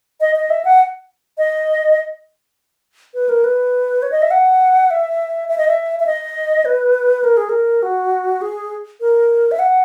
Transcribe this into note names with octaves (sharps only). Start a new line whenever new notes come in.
D#5
D#5
E5
F#5
D#5
B4
A#4
B4
C#5
D#5
E5
F#5
E5
E5
D#5
E5
E5
D#5
B4
A#4
G#4
A#4
F#4
G#4
A#4
E5
F#5